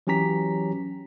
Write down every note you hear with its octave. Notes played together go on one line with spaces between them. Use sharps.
E3 F#3 C#4 G4 A#5 B6